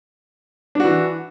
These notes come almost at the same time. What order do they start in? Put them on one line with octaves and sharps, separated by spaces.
D4 F#4 E3